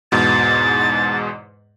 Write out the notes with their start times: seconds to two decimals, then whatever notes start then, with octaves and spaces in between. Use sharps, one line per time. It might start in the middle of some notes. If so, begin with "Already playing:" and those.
0.12 E2 G#2 B2 A6